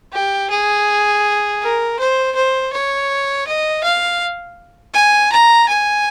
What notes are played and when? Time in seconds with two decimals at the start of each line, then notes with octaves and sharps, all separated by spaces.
0.13 G4
0.50 G#4
1.62 A#4
1.99 C5
2.36 C5
2.73 C#5
3.47 D#5
3.84 F5
4.94 G#5
5.32 A#5
5.68 G#5